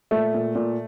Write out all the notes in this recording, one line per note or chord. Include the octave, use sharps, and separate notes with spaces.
A#2 A3
A#2
A#2